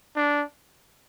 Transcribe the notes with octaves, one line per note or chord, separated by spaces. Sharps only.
D4